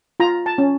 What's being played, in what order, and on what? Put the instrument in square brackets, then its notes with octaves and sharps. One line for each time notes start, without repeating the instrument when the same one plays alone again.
[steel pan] F4 A#5
A5
C#4